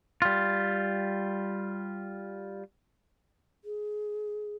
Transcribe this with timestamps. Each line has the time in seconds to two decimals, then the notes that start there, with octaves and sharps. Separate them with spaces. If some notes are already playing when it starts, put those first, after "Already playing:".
0.22 G3 F4
3.64 G#4